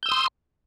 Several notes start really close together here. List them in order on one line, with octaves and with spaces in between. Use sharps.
G6 E6 D#6 C6